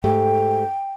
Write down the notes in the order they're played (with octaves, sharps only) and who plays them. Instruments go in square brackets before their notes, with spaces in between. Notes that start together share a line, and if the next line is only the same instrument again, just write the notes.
[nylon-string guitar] G#2 A3 G4 [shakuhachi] G5